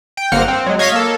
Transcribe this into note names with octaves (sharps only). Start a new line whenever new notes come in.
G5
G1 A#3 C4 F#5 F6
C4
F#3 G#3
C#5 D#5 F5 G#6 A#6 B6
A#3 A4